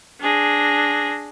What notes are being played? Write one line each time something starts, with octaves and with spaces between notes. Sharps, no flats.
D4 G#4 A#6